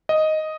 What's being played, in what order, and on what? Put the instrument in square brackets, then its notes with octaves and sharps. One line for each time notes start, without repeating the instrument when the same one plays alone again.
[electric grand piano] D#5